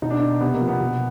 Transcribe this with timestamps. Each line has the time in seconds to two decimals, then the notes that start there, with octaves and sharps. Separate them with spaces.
0.02 B2 D#4
0.10 D4
0.19 D#4
0.41 C3 B3
0.54 A#3
0.61 F3
0.67 B3
0.80 B2